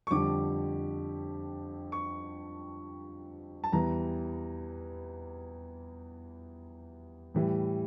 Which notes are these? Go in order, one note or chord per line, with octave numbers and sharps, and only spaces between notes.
C#6
F2 D3 G3 D6
C#6
A5
E2 E3 G3 A#5
A2 E3 G3